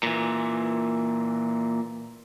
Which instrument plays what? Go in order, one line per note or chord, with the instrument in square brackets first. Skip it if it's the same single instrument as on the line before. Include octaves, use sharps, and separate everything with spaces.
[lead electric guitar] A#2 E3